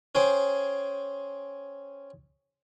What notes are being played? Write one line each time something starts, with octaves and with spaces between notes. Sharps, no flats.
C#4 G#4 C5 G5